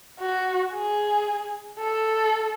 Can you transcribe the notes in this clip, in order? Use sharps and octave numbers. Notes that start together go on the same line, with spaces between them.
F#4
G#4
A4